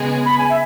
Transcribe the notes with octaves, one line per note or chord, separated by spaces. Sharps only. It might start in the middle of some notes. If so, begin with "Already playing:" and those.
Already playing: C#3 G#3 B3 G#4
B5
G#5
E5